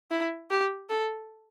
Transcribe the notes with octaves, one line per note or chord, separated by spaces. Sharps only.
E4
G4
A4